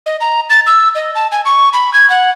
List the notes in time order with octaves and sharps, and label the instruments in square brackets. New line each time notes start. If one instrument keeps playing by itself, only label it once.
[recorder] D#5
A#5
A6
E6
D#5
A5
G#5
C#6
B5
G#6
F#5